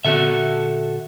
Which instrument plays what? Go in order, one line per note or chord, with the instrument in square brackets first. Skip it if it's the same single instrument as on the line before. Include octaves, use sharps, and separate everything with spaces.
[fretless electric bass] A#2 D3 B3 [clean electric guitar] F#4 A4 E5